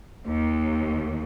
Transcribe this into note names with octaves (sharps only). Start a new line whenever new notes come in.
D#2